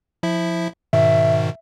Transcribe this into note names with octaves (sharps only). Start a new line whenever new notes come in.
F3 E4 E5
G#2 B2 D#3 E5